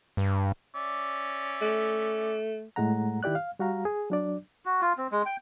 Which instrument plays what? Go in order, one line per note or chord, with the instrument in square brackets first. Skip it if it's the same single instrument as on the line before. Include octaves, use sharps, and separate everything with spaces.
[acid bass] G2
[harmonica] C#4 D5 E5
[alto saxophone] A3
[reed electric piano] A2 G#3 A3 F#5 A#5
D#3 E4 G4 D5 F#6
F5
G3 F#4 F5 A#5
G#4
F#3 D4 D5
[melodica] F#4
F4
C4
G#3
G5